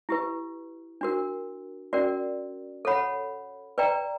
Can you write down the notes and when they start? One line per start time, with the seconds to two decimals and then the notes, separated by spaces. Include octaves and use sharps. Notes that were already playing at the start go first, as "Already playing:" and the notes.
0.09 E4 G4 B4
1.01 D4 F#4 A#4
1.93 C#4 F#4 A#4 D5
2.85 A4 C#5 F#5 B5
3.78 B4 D5 G5 A#5